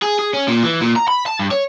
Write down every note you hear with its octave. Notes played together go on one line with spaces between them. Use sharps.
G#4
G#4
C#4
A#2
E3
A#2
A#5
B5
A5
G2
C#5